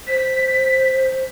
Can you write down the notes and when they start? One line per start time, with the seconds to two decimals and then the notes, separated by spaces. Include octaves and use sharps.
0.07 C5 B6